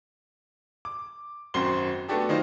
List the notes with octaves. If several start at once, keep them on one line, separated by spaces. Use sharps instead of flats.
D6
G#1 F#2 C4 F#4 C6 G7
A3 B3 D4 F#4 G4 A4
D#3 F#3 D#4 F4 C5